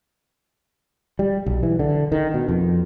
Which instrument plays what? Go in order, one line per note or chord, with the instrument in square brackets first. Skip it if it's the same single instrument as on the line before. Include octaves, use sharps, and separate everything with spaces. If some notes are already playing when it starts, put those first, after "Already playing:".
[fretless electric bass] G3
B1
E3
D3
D#3
B2
F2